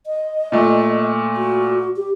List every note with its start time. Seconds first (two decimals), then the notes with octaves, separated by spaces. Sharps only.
0.06 D#5
0.52 A#2 A3
1.37 F#4
1.96 G4